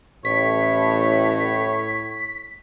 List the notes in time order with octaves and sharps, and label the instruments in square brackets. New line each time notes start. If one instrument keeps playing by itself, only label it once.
[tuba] A1 [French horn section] A2 [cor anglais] C#5 [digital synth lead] B6